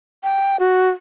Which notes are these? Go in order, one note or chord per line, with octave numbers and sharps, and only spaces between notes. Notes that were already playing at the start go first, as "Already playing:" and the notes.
G5
F#4